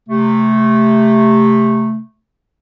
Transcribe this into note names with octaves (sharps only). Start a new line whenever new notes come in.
C3 A3